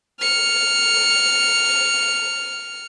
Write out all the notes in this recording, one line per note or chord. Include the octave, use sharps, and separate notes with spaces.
F6 C#7